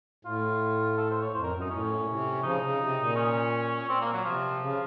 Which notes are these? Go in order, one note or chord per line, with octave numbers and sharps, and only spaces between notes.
A2 F4
A4
C5
C#5
F2 C5
A#4
F#2
D#4
A2 C#4
A#2
C3
C#3 F3 D#4
C#3
C3
A#2
C#4
A#2 C4
A#3
F#3
C3 F3
C#3